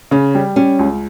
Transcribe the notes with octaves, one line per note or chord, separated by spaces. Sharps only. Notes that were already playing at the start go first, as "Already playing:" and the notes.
C#3 C#4
G3
G3 C#4
C#2